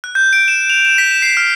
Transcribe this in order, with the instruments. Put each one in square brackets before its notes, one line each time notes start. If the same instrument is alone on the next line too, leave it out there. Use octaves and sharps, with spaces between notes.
[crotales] F#6
G6
D7
E7
F7
E7
B6
E7
C7
F6